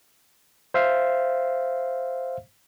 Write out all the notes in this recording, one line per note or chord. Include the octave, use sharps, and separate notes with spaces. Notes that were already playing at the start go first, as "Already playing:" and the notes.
C5 E5 F5